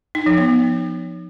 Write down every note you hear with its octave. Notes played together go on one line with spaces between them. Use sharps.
D#4
F3
B3